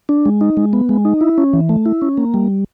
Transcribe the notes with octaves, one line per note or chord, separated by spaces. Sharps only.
D4
G#3
D#4
G#3
B3
G#3
D#4
E4
C#4
E3
A3
E4
C#4
A#3
G3